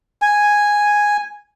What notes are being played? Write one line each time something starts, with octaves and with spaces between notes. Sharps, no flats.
G#5